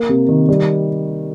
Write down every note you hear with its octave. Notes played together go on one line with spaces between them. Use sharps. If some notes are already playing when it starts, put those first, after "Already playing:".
Already playing: A#3
C3
D#3
G3